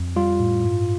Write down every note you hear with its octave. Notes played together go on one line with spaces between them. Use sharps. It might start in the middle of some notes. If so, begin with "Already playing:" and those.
Already playing: F2
G3 F4
A2
G2